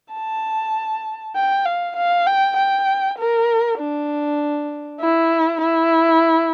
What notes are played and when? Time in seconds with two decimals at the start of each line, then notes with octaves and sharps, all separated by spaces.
0.13 A5
1.36 G5
1.65 F5
1.96 F5
2.26 G5
2.57 G5
3.18 A#4
3.79 D4
5.01 E4
5.61 E4